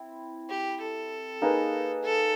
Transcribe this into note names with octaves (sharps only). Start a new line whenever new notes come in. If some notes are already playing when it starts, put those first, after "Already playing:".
Already playing: C4 E4
G4
A4
A#3 D#4 G#4 B4
A4